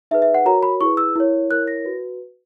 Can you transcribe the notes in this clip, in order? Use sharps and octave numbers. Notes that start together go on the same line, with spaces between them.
D#4 G#4 B4 E5
E5
F#5
F#4 A#4 C#5 A#5
B5
E4 G#4 B4 C#6
E6
E4 A#4 C#5
E4 A#4 C#5 F#6
A#6
F#4 B4